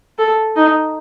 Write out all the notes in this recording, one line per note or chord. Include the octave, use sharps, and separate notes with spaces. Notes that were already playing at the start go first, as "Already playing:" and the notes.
A4
D#4